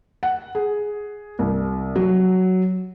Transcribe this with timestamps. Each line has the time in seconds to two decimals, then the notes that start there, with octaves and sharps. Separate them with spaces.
0.23 F#5
0.55 G#4
1.39 C2
1.96 F#3